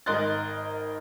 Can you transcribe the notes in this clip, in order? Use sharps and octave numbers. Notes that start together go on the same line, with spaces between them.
G#1 A#4 D#5 C6 F#6 A6